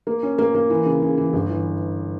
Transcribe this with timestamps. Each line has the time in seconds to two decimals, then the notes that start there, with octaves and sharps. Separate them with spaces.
0.07 A#3
0.23 C#4
0.38 A#3
0.55 A#3
0.70 E3
0.86 C#3
1.02 C#3
1.18 E3
1.33 G1
1.50 E3